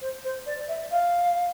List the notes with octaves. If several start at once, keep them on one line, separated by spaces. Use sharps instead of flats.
C5
C5
D5
E5
F5